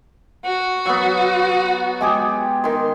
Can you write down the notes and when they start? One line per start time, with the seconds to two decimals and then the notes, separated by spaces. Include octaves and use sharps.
0.45 F#4
0.86 F#3 B3
2.01 G#3 G4 G#4
2.64 D#3 C6